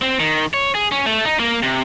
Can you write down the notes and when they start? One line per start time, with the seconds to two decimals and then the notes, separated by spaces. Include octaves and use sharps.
0.02 C4
0.19 D#3
0.54 C#5
0.75 G#4
0.92 C#4
1.06 A3
1.25 D#4
1.39 A#3
1.63 C3